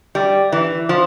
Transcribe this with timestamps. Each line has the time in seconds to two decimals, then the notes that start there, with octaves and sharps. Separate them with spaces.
0.15 G3
0.52 E3
0.89 F3